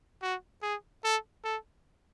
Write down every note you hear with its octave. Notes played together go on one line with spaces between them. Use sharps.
F#4
G#4
A4
A4